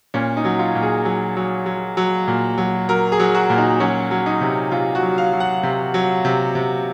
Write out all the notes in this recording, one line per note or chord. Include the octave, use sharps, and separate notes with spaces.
A#2 C#4
D#4
F#3
F4
A#2
G#4
F#3
F#3
F#3
F#3
A#2
F#3
F#3 A#4
G#4
F#3
F#4
A#2
D#4
F#3 C#4
F#3
D#4
C3
C3 F4
F#4
F#3
F5
F#3
F#5
C3
F#3
C3
C3